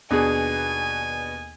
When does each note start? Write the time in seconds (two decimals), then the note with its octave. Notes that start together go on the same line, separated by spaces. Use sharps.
0.11 D#2 B2 B3 D4 G#4 G#5